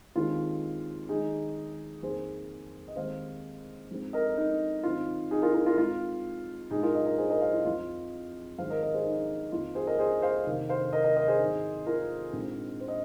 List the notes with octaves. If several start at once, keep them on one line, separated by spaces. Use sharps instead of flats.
D#2 D#3 G#3 C4 F4
D#2 D#3 G#3 D#4 G#4
F2 D#3 A#3 G#4 C5
D#5
D#2 D#3 G#3 C4 C5 F5
G#2 F3 G#3 C4
A#4 D#5
D#4
G#2 D#3 C4 F4
D#4 G#4
F4 A#4
F4 A#4
F4 A#4
G#2 G#3 C4 F4
A#1 G#2 G#3 D#4 G#4
F4 A#4
A#4 D#5
A#4 D#5
G#4 C5
A#4 D#5
C5 F5
F4
F2 F3 C4 F4
G#1 G#2 F3 G#3 C5 F5
A#4 D#5
A#4 D#5
G#4 C5
D#4
F2 D#3 A#3 F4
G#4 C5
A#4 D#5
G#4 C5
C5 F5
F1 D#2 D#3 A#3
C5 F5
A#4 D#5
A#4 D#5
A#4 D#5
G#4 C5
G#1 G#2 D#3
F4 A#4
A#1 G#2 G#3 C4
C5
D#5